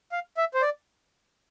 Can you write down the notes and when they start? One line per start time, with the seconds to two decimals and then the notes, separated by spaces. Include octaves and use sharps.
0.12 F5
0.37 E5
0.54 C5
0.62 D5